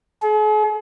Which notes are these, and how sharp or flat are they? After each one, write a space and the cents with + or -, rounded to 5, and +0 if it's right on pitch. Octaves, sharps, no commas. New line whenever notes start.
G#4 +45